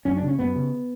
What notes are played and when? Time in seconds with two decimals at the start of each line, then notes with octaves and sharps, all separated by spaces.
0.05 F#2 C#4
0.17 D4
0.22 C#3
0.28 C#4
0.39 F#2 B3
0.56 C#3